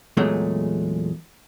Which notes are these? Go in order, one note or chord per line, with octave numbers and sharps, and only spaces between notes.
E2 A#2 F#3 G#3 A3